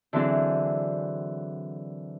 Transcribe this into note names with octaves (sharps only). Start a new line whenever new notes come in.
D3 E3 F#3 C4 D4 G#4